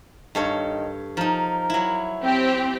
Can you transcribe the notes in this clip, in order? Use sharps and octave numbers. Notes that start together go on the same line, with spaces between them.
G2 D#3 A4 C#5
F3 D#4 A#4
F#3 E4
C4 G4